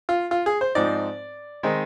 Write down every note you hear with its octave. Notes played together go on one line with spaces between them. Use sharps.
F4
F4
G#4
C5
G#2 F3 C4 D#4 D5
D#3 G#3 C4 D#4